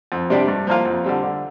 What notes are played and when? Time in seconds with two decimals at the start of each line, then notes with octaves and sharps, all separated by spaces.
0.12 F2
0.30 C3 G3 D4 G4
0.48 G2
0.67 F3 A#3 F4
0.85 F2
1.04 D3 G3 C4
1.23 D3